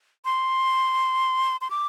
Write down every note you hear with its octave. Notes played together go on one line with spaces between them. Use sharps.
C6
C6
D6